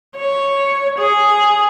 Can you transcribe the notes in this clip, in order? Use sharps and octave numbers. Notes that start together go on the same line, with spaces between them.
C#5
G#4